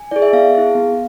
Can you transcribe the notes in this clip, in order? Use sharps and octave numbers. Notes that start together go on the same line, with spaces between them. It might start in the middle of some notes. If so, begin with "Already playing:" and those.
Already playing: G#5
E4 G#4 D5
E5
B3 F5
E4 G#4
B3